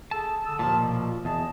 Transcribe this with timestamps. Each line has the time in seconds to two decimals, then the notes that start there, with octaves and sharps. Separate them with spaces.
0.11 G#4 A4 A5
0.45 D3 D#6 E6
0.59 D#2 A#2 D#3 F3 A5
0.79 B2
1.25 E2 G#4 D#5 A5